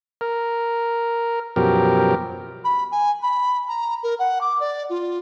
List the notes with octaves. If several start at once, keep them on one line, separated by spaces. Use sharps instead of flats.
A#4
F#2 B2 F3 G4 A#4
B5
G#5
B5
A#5
A#4
F#5
D6
D5
F4